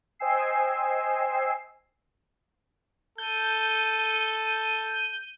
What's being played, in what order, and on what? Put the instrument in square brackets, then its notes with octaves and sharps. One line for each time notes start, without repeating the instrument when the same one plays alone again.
[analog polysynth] C5 D#5 G5 G#5 E6 C7
[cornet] A4 [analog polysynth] G6 D#7